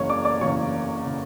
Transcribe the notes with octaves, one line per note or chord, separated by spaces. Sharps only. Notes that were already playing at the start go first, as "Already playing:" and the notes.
Already playing: F#1 E2 C#3 C#5 C#6
D5 D6
D5 D6
F#1 E2 C#3 C#5 C#6
C#3